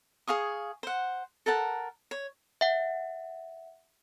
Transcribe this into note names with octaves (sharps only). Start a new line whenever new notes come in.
G#4 F5 C#6 D#6
C5 F#5
A4 A#4 F#5 A5
C#5
E5 F#5